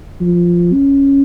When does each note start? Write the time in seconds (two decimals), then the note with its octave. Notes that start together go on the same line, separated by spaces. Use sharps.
0.20 F3
0.73 C#4